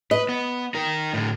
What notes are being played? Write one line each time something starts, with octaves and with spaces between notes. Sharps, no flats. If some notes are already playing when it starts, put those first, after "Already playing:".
B4 D#5
B3
D#4 A#4
A2 D3